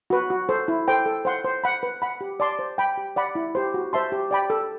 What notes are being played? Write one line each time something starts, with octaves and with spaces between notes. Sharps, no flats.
F#4 B4
F#4
A4 C5
E4
A4 C5 G5
A4
C5 F#5 C6
C5
F#5 B5
B4
F#5 B5
G4
D5 A5 C6
C5
G5 B5
G4
D5 F#5 B5
E4
G4 C5
F#4
C5 E5 A5 C6
G4
D5 G5 B5
A4